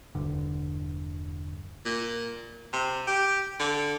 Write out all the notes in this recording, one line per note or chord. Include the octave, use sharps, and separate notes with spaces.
E1 D2 G2 D3
A#2
C3
G4
D3